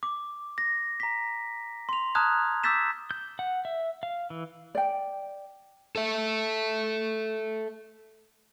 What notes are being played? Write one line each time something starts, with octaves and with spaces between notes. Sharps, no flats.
D6
A#6
A#5 B6
C6 F7
A5 A#5 D#6 F6 F#6 G#6
D6 E6 G6 A6 B6 E7
G6
F#5
E5
F5
E3
D5 G5
A4 E5